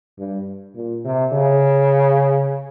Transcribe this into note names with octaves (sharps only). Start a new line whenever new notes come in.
G2
A#2
C3
C#3